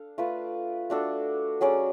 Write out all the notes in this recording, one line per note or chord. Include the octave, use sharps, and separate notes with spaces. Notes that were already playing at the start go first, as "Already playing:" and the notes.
Already playing: D4 A4 F5
A3 F4 B4 D5
A3 D4 F#4 A4
F#3 C#4 G#4 D5